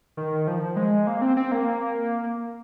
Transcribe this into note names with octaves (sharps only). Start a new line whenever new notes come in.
D#3
F3
G#3
A#3
C4
C4
A#3